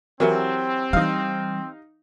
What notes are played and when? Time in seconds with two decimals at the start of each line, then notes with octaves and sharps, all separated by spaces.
0.20 E3 F#3 C4 G4 A#4 F#5
0.93 E3 G3 D#4 F5